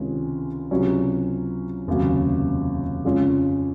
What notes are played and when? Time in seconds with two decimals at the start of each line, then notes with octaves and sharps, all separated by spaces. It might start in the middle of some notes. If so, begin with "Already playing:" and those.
Already playing: C#2 C3 D#3 G#3 C#4
0.71 C#2 C3 F#3 C#4
1.87 F1 D#2 C#3 F#3
3.05 F2 C#3 G#3 C#4 F4